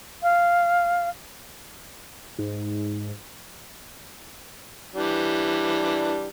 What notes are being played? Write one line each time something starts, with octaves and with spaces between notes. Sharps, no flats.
F5
G#2
E3 G3 D4